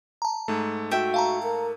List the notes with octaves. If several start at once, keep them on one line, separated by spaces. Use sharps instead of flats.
A5 A#5
G#2 A3
F#4 E5 G5
F5 A5 A#5
A#4